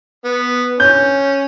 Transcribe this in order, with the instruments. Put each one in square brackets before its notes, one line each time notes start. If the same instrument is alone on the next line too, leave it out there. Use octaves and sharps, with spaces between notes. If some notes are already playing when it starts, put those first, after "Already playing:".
[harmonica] B3
[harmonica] C#4 [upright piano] G6